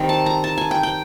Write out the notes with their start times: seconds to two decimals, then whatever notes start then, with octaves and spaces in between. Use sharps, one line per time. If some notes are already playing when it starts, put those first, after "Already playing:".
Already playing: D#3 G3 C4
0.09 A5
0.26 A#5
0.44 A5
0.58 G#5
0.71 G5
0.83 G5